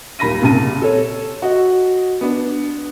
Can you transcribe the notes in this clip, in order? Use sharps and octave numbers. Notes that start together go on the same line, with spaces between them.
D#1 D#2 B5 A#6 D#7
C2 A#2 C#3 A5 D#7
A4 C#5
F#4 D#5
B3 D4